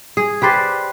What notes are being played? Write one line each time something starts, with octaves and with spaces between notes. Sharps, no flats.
G#4
G4 B4 C5 D5